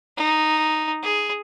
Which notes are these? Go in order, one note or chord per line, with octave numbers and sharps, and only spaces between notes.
D#4
G#4